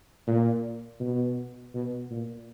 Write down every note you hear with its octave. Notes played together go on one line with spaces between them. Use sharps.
A#2
B2
B2
A#2